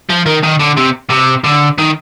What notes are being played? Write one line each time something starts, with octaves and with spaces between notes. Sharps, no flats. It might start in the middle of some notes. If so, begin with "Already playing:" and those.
F3
D#3
D#3
D3
C3
C3
D3
D#3